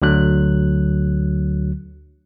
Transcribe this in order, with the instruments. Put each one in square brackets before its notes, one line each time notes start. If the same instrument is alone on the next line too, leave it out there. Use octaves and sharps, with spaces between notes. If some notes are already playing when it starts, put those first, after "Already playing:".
[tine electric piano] D2 D3 F#3 F#6